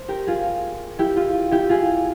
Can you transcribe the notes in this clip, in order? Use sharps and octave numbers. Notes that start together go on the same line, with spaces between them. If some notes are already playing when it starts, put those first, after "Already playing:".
Already playing: C5
G4 A#4
F4 G#4
E4 G4
F4
E4 G4
F4 G#4